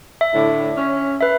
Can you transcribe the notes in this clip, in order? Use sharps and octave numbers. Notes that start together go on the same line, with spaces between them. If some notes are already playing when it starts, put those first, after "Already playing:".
E5
A2 D3
C#4
B4 E5